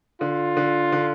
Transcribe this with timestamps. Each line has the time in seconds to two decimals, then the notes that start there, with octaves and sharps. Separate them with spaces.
0.21 D3 F4
0.57 D3
0.92 D3